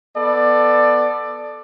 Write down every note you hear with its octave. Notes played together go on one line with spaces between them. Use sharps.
B3 A4 D5